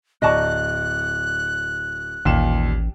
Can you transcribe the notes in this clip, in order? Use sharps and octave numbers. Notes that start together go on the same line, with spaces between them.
D1 D5 D#5 A5 A#5 C#6 F#6
A1 D#2 A#2 E7